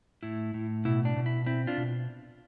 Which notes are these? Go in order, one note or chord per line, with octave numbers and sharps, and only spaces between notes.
A2 E4
A2
B2 E4
D4
B2
E4
C4 E4
D4 F4
B2